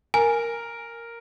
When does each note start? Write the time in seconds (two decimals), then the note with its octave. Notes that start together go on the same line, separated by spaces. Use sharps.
0.14 A#4 G#5